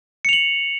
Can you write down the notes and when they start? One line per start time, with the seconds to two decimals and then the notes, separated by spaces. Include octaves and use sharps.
0.25 C#7
0.29 F7
0.33 F#7